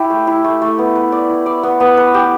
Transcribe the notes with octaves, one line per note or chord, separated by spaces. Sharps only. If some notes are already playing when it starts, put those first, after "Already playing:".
Already playing: E4 G4
A3
E4
A3
A3
B3
B4
D5
E4
D5
B3
B3
B4
G4